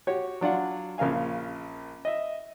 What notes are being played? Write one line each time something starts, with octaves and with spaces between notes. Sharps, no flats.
F#4 G4 C#5
F#3 D4 F4 F#5
A#1 C#3 A#4 F5 G#5
D#5 E5